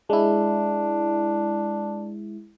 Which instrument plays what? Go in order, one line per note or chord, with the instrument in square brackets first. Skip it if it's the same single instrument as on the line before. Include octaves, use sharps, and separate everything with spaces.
[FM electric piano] G#3 E4 [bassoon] D4